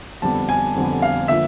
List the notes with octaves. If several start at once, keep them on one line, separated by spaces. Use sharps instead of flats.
F2 D3 G3 B3 A5
G#5
F2 D3 G3 B3
F5
D3 F3 A#3 E5